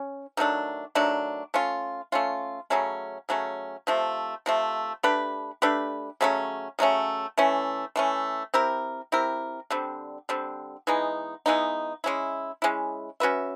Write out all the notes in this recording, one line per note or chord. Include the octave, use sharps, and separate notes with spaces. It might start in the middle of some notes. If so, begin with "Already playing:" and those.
Already playing: C#4
D#3 F#3 A3 D4
D#3 F#3 A3 D4
A3 C#4 F4
A3 C#4 F4
C#3 F#3 A3 C#4
C#3 F#3 A3 C#4
C3 F3 A3
C3 F3 A3
A3 D4 G4 B4
A3 D4 G4 B4
C#3 F#3 A3 C#4
C#3 F#3 A3 C#4
E3 A3 C#4
E3 A3 C#4
C4 E4 G4 A#4
C4 E4 G4 A#4
D3 G3 C4
D3 G3 C4
E3 G#3 B3 D#4
E3 G#3 B3 D#4
G#3 C#4 E4
G#3 C#4 E4
C#4 F#4 B4 E5